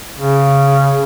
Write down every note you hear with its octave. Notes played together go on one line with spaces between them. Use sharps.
C#3